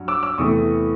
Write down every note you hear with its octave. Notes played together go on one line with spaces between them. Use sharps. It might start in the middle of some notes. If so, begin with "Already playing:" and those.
Already playing: G2 F#3
D6 E6
D6 E6
E2 C3 E3 A3 C4 C#6 D#6